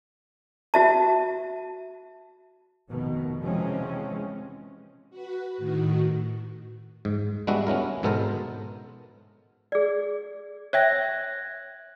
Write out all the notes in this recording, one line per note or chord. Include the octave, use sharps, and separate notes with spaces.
F#4 E5 A5
F1 B2 D#3
C3 E3 F3 G#3 C4 C#4
F#4 B4
A2 D#3 F#4
G#2
G3 G#3 B3 D4 F#4 E5
B3 C#4 E4 A#4
G#2 B2 B3 A4 A#4 C5
G#4 D5
C#5 E5 G5 F#6 G#6 A#6